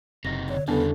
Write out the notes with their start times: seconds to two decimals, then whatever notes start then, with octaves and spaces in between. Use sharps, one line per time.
0.25 F#1 C3 D#4 A#6
0.49 D3 C#5
0.68 E2 C#3 G3 B3 D4 A4